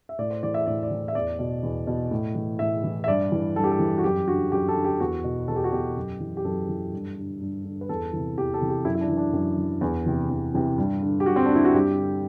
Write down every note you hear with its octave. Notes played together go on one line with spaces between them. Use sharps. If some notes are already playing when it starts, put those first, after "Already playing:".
E5
A2 D5
C5
E3 D5
E5
A2 D5
D5
E3
E5
E2 D5
B2
E2
B2
A2
E3
A2 E5
E3
E5
G2 D5
E3
G2 A4
G4
A4
E3
F#4
F#2 G4
D3 F#4
F#2 G4
A4
D3
G4
E2 F#4
B2
E2 A4
G4
F#4
B2 G4
F#2
E3
G4
F#2 A4
E3
G2
D3
G2
D3
B4
E2 A4
C3 E3
E2 G4
A4
C3 E3
G4
F#2 E4
E4
D4
E3
D4
F#2
E3
E2
C3 E3
E2
C3 E3
G2
D3
G4
G2 F#4
C4
D4
D3 E4
F#4
G2 G4
D3